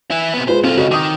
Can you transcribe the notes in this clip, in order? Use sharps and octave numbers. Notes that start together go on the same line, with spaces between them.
E3 E4
C3 B3
G#3 F4 B4 C5
B1 C4 F4 A4
C#2 C#3 F#4 D#5
D#3 D6 D#6